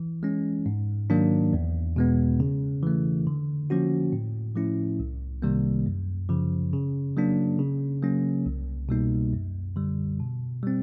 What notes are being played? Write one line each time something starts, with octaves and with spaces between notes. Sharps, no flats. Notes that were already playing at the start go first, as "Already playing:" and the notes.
Already playing: E3
G#3 C#4
G#2
D#3 F#3 A#3 D4
E2
B2 G#3 B3
C#3
E3 A3
D3
F3 A#3 C#4 F#4
A2
F3 A3 C#4 E4
C2
C3 D#3 G3 A#3
F#2
C#3 F3
C#3
F#3 A#3 D4
C#3
F#3 A#3 C#4
C2
B2 G3 A#3 D#4
F#2
D3 G3
B2
G3 C4